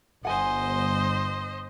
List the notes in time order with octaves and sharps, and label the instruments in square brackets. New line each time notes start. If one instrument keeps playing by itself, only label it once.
[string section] G1 [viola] C5 D#5 [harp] F#5 G#5